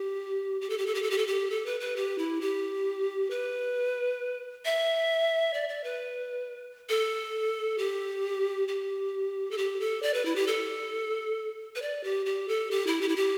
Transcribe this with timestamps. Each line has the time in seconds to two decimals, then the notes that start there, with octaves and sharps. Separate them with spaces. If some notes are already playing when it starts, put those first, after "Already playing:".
Already playing: G4
0.61 G4
0.70 A4
0.78 G4
0.86 A4
0.95 G4
1.03 A4
1.11 G4
1.18 A4
1.27 G4
1.50 A4
1.66 B4
1.80 B4
1.96 G4
2.18 E4
2.41 G4
3.30 B4
4.65 E5
5.54 D5
5.69 D5
5.84 B4
6.89 A4
7.78 G4
8.68 G4
9.51 A4
9.58 G4
9.80 A4
10.02 D5
10.14 B4
10.25 E4
10.36 G4
10.47 A4
11.75 B4
11.82 D5
12.04 G4
12.26 G4
12.48 A4
12.71 G4
12.87 E4
13.01 G4
13.09 E4
13.16 G4